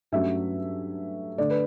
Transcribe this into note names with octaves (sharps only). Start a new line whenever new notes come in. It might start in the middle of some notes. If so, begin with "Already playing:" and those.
G2 F#3 A3 C#4 E5
D3 A3 D5
B4